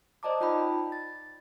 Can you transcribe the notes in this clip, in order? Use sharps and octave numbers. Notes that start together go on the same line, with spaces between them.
C5 D5 D#5 A5 A#5 D6
D#4 F4 G5 A5 B5
A6